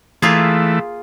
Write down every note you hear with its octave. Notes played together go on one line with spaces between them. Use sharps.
E3 A3 A#3 F4 G#4